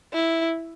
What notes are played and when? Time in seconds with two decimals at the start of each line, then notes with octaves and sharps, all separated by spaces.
0.13 E4